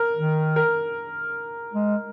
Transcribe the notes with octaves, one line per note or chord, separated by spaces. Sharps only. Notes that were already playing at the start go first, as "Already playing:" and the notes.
Already playing: A#4
D#3
A#4
G#3